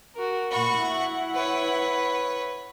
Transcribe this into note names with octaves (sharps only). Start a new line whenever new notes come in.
F#4 A#4
A#2 F#4 B5 C#6
E4 F#5
B4 C#5